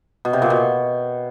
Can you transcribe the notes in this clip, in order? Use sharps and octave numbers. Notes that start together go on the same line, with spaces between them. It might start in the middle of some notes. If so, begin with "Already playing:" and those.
B2
C3
A#2
B2